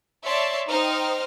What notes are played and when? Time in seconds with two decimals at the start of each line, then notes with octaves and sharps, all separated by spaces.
0.24 C#5 D5 E5 A5 C6
0.68 D#4 C5 D#5 G5 F6